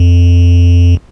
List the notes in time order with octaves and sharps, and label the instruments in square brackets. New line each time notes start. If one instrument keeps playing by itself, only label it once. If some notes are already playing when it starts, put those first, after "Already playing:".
Already playing: [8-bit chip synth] F2